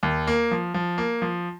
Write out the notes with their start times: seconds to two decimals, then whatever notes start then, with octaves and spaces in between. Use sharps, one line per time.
0.03 D#2
0.27 A#3
0.51 F3
0.74 F3
0.98 A#3
1.22 F3